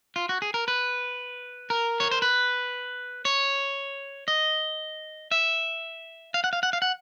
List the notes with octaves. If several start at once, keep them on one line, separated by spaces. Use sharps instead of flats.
F4
F#4
G#4
A#4
B4
A#4
C#5
C5
B4
C#5
D#5
E5
F5
F#5
F5
F#5
F5
F#5